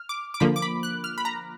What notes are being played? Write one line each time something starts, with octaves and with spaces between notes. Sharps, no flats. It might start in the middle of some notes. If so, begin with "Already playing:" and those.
Already playing: F6
D6
D6
D3 F3 A#3 B5
D6
B5
F#6
F6
B5
A#5